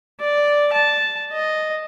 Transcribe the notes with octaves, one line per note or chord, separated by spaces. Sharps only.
D5
A5
D#5